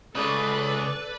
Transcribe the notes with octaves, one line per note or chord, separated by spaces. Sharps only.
C#2 C#3 A4 B4 D5